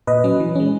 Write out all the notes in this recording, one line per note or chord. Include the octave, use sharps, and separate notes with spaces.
A#2 B4 D#5
F#3 C#4
E3
G#3 C#4